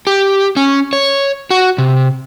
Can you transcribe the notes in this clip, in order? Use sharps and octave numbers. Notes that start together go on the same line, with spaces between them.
G4
C#4
C#5
F#4
C3